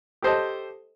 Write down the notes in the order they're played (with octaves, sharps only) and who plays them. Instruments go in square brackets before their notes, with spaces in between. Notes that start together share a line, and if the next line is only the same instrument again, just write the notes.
[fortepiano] G4 A4 C5 D#5 A5